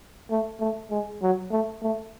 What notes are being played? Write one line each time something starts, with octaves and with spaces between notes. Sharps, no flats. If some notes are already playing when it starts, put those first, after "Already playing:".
A3
A3
G#3
F#3
A3
A3